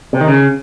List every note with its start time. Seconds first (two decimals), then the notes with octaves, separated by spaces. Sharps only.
0.13 C3
0.21 D#3
0.28 C#3